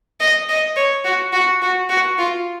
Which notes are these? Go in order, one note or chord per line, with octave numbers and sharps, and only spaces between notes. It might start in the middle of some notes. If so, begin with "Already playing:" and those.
D#5
D#5
C#5
F#4
F#4
F#4
F#4
F4